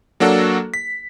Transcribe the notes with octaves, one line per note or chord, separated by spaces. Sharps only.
F#3 A#3 D4 F#4 A4
B6